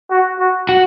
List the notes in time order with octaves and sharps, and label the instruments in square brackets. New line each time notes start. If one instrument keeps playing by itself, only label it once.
[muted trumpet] F#4
F#4
[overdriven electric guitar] F#4